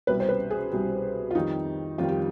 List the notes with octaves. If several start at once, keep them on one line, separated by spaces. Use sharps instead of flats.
C2 B2 G3 B4
C5
B4
G#4
C2 B2 G3
F4
F2 D#3 G3 D#4
F2 D#3 G3 F4
G4